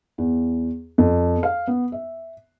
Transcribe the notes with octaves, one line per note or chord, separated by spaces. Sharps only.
E2
F2
F5
B3
E5